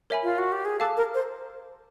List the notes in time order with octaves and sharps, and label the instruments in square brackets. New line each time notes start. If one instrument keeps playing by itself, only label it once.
[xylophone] A#4 C#5 E5 G#5 B5
[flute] F4
F#4
G4
G#4
[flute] A4 [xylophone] F5 A5 D6 F#6
[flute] A#4
C5